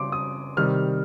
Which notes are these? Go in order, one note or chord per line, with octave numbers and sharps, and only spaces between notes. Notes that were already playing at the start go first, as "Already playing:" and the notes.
Already playing: C#3 G3 C6 D6
D#6
C3 D#3 G3 F6